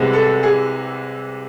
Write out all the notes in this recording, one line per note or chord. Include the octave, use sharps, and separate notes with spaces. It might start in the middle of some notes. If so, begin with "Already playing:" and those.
Already playing: C2 C3 G#3 B3
A4
G#4